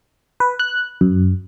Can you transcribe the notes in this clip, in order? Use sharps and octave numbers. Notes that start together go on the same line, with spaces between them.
B4
F#6
F#2